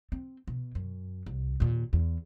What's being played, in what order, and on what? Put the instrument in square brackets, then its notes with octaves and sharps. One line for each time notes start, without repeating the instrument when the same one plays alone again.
[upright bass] C4
B2
F#2
C2
D#2 A#2
E2